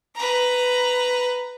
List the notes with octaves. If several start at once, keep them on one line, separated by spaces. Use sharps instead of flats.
B4 A#5